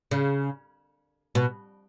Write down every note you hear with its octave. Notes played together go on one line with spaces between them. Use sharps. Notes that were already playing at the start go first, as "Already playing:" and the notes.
C#3
B2